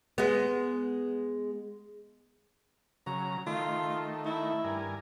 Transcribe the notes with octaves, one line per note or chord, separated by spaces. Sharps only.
G#3 B3
C#3 F#3 A#5
D#3 A3 F4
E4
G2 A#4 G#5